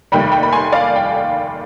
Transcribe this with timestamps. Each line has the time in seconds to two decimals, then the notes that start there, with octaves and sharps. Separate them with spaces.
0.12 F1 D#2 D#3 G3 G5 B5
0.32 G5 B5
0.43 B5
0.53 G#5 C6
0.72 D5 F5
0.96 G5